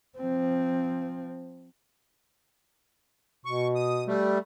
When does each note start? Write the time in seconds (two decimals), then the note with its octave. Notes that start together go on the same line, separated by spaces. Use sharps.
0.18 F3 C4
3.45 B2 C#6
3.75 D#6
4.07 G3 A3